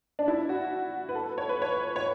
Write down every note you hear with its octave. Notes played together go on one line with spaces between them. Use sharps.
D4
E4
F#4
B4
A4
C#5
B4
C#5
C#5